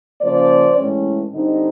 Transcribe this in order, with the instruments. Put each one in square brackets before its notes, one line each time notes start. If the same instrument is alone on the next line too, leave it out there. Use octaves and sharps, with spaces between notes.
[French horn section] C#3 F3 A#3 C5 D5
A2 E3 G#3 C#4
D3 G3 C4 D#4